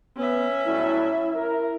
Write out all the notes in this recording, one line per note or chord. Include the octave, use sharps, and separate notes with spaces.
B3 C#4 E5
A2 F#3 G3 E4
A#4